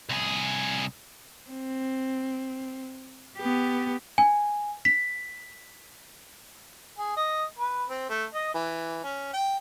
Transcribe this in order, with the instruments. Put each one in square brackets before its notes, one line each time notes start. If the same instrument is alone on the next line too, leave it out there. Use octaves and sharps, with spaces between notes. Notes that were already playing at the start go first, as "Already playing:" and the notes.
[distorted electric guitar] C2 G#4
[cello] C4
B3 G4
[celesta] G#5
B6
[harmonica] G#4
D#5
B4
C4
A3
D#5
E3
C#4
G5